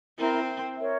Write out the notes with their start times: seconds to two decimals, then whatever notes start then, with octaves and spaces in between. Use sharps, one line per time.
0.18 C4 E4 A#4 E5 A#5
0.79 A#4 C#5 E5